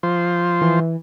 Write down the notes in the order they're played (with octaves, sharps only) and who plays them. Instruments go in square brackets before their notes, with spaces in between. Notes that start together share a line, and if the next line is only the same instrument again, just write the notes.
[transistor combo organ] F3 C5
[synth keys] E3